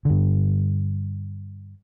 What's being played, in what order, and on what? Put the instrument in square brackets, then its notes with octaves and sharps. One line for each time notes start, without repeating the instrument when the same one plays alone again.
[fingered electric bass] G2 D3